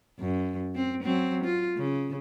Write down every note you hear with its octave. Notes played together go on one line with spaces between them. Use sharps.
F#2
C4
F#3 C4
F4
C#3